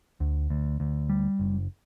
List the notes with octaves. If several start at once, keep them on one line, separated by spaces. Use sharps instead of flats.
D2
D2
D2
G3
F#1